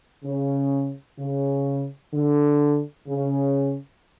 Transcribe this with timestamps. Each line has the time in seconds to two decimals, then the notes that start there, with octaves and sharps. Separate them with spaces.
0.24 C#3
1.19 C#3
2.14 D3
3.08 C#3